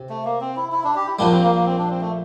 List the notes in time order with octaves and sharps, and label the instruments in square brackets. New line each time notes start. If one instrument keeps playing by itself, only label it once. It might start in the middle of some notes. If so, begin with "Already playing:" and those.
Already playing: [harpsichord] C3
[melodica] A3
A#3
C4
E4
E4
D4
G4
E4
[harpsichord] A#1 A#2 G3 [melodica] D4
[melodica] C4
A#3
A#3
C4
D4
C4
A3